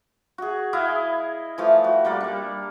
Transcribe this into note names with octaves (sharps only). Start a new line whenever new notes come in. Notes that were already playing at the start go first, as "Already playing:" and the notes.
F#4 G#4
E4 G#4 D#5 F5
E3 F3 A3
F#4
G3 A#3 D5
G3 D4